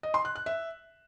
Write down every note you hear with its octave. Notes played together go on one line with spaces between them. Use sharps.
D#5
C6
F#6
F#6
E5